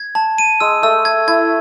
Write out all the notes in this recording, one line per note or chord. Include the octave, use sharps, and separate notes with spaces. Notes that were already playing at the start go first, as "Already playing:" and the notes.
Already playing: G#6
A5
D#7
G#3 E6
A3 E6
G#6
E4 G#6